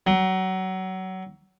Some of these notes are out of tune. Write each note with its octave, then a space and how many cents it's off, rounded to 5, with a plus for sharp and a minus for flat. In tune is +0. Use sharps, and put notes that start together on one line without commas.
F#3 +25